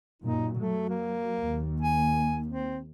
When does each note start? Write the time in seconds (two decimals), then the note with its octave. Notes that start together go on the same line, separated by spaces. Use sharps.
0.22 F#2 A#2 D#4
0.59 F#3 A3
0.90 A#3
1.39 D#2
1.81 G#5
2.47 C4